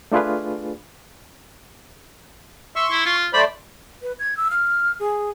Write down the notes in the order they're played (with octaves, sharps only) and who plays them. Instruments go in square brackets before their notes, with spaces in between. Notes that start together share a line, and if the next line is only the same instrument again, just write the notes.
[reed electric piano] A3 D4 F4 G#4 B4
[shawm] E5 [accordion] C6 C#6
[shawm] E4
F4
[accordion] A3 C5 D5 [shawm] B5
[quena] B4
G#6
E6
F6
G#4